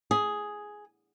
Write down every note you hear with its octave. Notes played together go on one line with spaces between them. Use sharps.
G#4